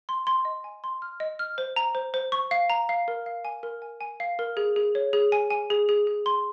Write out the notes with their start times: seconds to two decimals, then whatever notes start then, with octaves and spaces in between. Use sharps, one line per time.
0.09 C6
0.27 C6
0.45 D#5
0.64 G#5
0.84 C6
1.02 F6
1.20 D#5
1.39 F6
1.58 C5
1.76 A#5
1.95 C5
2.14 C5
2.32 C#6
2.51 F5
2.70 A#5
2.89 F5
3.08 A#4
3.26 F5
3.45 G#5
3.63 A#4
3.82 G#5
4.01 G#5
4.20 F5
4.39 A#4
4.57 G#4
4.76 G#4
4.95 C#5
5.13 G#4
5.32 G#5
5.50 G#5
5.70 G#4
5.89 G#4
6.07 G#4
6.26 C6